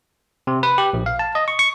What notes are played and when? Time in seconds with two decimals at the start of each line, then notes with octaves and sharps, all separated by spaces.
0.47 C3
0.63 B4
0.78 G4
0.93 A#1
1.06 F5
1.19 A5
1.35 D#5
1.48 C#6
1.59 C#6